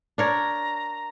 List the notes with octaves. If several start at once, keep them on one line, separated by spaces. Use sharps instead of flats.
D4 A#4 C#5 A#5